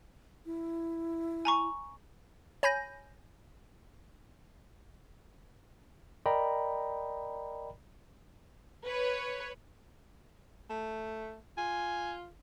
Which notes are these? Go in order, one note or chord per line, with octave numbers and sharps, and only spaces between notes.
E4
G#5 A#5 C#6
C#5 G#5 B5 G6 A#6
A#4 D5 D#5 G5 A#5 B5
B4 C#5
A3
F4 G#5